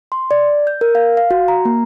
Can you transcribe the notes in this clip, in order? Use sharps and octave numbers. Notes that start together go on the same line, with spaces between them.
C6
D5
G6
A#4
F5
F5
F#4
A#5
A#3